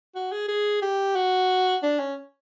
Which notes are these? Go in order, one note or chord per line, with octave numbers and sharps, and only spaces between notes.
F#4
G#4
G#4
G4
F#4
D4
C#4